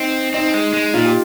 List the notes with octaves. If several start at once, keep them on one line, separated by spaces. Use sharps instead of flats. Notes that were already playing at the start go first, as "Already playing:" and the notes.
Already playing: C4 D#4
C4 D#4
G#3
G#3
A#2 F4
G4